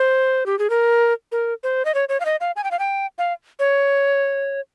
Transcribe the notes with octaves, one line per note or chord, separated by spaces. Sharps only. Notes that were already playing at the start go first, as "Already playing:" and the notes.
Already playing: C5
G4
G#4
A#4
A#4
C5
D#5
C#5
C#5
F5
D#5
F5
G#5
G5
F5
G5
F5
C#5